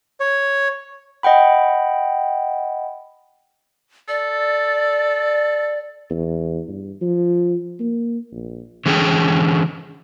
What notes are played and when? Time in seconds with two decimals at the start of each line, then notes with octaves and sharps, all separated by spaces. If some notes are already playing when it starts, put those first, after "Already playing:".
0.20 C#5
1.23 D#5 F#5 G5 B5
4.09 A4 D5
6.10 E2
6.68 G2
7.01 F3
7.80 A#3
8.32 A#1
8.86 D3 E3 G#3 C#4 G#4 G5